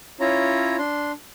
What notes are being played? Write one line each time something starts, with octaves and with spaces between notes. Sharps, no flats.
C#4 E4 F4 C#5 A#5
D4 C6